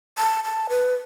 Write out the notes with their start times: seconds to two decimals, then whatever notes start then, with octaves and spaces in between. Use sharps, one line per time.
0.18 A5
0.44 A5
0.70 B4